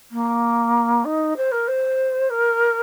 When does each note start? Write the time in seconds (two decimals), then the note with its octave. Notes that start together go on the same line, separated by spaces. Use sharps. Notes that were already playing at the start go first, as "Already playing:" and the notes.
0.11 A#3
1.04 D#4
1.36 C5
1.51 A#4
1.67 C5
2.30 A#4